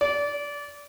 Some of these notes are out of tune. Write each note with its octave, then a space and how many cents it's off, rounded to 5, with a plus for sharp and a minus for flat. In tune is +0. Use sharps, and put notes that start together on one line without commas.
D5 -25